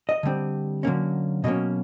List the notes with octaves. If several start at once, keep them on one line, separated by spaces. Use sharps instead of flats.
D#5
D3 G3 C4
D3 F#3 A#3 C#4
B2 F#3 A#3 C#4 D#5